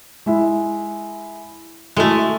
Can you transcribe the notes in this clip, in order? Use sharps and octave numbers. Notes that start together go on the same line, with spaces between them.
G#3 E4
G#3 A3 E4 F#4 A4